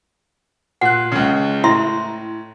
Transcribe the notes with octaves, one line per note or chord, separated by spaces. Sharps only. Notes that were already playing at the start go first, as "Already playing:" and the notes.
A#2 F#5 F#6
C#2 C#3
A2 E4 E5 C6